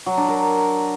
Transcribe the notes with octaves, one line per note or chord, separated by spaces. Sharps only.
F#3
D4
A#4